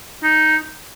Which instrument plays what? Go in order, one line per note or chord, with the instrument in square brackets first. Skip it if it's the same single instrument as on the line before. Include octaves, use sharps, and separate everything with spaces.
[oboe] D#4